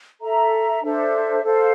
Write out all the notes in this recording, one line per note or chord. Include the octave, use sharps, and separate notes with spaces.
A4 E5 A#5
D4 A4 C5 E5
A4 C5 F5